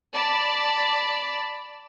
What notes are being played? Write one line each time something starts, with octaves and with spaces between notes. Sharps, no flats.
D5 A5 B5